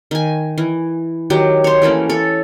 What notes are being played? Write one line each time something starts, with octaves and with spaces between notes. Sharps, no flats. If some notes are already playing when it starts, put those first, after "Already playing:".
D#3 G#5
E3
D#3 F#3 G4
C5 C#5
E3 A3 A#3 C#4
A4 C#5